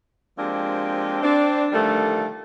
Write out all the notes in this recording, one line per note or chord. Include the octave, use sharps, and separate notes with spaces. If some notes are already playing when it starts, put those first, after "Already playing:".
F3 G#3 A#3 C4 D4 G4
C4 D4
D3 D#3 F3 G3 A3 A4